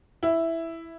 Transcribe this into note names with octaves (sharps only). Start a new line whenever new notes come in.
E4